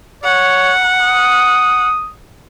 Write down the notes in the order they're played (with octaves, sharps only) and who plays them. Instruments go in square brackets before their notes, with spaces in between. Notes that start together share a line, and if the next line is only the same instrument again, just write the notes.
[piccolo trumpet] C#5 [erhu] F#5
[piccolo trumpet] D#6